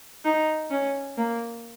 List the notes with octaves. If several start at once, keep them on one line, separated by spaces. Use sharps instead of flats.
D#4
C#4
A#3